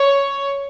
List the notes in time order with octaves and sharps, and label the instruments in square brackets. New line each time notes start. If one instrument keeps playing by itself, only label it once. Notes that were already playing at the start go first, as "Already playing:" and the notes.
Already playing: [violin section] C#5